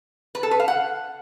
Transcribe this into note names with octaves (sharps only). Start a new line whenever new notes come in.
B4
A4
B4
F5
F#5